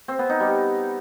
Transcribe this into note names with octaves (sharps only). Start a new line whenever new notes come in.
C4
B3
D#4
G3